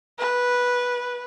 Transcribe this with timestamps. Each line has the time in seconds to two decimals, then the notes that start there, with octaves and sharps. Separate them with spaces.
0.19 B4